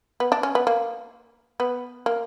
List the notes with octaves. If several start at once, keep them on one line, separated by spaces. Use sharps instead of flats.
B3
D4
C#4
B3
A#3
B3
A#3